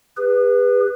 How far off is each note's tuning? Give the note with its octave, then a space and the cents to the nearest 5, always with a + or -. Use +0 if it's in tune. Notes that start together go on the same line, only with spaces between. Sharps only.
G#4 -45 B4 +0